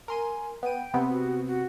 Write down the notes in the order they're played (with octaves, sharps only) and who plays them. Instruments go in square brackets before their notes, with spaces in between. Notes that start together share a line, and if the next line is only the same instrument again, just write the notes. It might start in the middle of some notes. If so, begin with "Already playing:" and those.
[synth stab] A#4 C6 D#7 [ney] G#5
[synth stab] B3 D#7 [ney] G5
[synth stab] C3 B3 C4
[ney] F#4
F#4